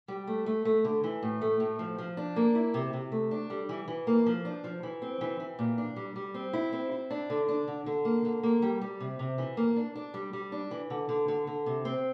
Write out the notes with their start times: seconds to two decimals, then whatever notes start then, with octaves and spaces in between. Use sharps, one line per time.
0.08 G3
0.27 A3
0.46 A3
0.65 A3
0.85 D3
1.04 E3
1.23 A2
1.41 A3
1.60 A2
1.79 F3
1.98 F3
2.17 D4
2.36 A#3
2.55 E4
2.74 C3
2.93 C3
3.12 A3
3.31 D4
3.50 G3
3.69 E3
3.88 E3
4.07 A#3
4.26 F3
4.45 D4
4.64 F3
4.83 E3
5.02 C4
5.21 E3
5.40 E3
5.59 A#2
5.78 D4
5.96 G3
6.16 G3
6.34 C4
6.53 E4
6.73 C4
6.92 E4
7.10 D4
7.30 D3
7.49 D4
7.68 D3
7.86 D3
8.05 A#3
8.25 D3
8.43 A#3
8.62 G3
8.81 G3
9.00 C3
9.19 C3
9.38 E3
9.57 A#3
9.76 D4
9.95 D4
10.14 G3
10.33 G3
10.52 D4
10.71 E3
10.90 D3
11.09 D3
11.28 D3
11.47 D3
11.66 C3
11.85 C4